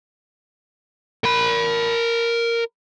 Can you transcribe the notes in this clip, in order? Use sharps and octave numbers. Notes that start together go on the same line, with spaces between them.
A#4 B5